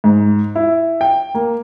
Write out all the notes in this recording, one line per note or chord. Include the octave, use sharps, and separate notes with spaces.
G#2
E4
G5
A#3